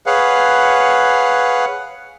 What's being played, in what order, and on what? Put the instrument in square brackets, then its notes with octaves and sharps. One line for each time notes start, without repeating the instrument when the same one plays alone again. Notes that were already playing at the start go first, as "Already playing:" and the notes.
[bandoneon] G#4 B4 C#5 F5 F#5